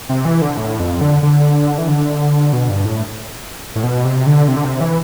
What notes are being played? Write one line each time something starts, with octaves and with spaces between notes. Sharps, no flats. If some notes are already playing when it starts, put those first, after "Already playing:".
C3
E3
D3
A2
F2
D3
D3
E3
D3
B2
G2
A2
A2
B2
C3
D3
C3
D3
C3
E3